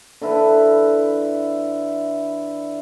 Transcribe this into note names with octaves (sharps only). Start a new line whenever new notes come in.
D3 E4 B4